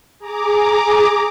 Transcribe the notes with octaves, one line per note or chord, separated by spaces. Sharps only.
G#4 A#5 D6